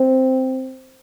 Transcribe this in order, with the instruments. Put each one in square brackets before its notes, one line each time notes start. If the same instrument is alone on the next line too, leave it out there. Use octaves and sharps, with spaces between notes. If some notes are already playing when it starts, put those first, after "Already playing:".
Already playing: [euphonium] C4